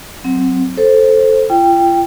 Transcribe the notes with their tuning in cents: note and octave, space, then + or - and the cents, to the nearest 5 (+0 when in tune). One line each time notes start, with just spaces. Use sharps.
F#3 +0 C4 +0
A4 +0 C5 +10
F4 -40 G5 +5